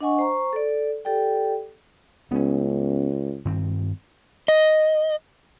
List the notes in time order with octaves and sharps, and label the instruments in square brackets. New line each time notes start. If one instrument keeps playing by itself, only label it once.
[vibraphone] D4 D#5 F#5 G#5 C#6
C5 A#5 C#6
A4 D5
G4 A4 D5 G5
[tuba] C#2 [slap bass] B3 C#4
[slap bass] G2 D#3 C4
[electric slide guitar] D#5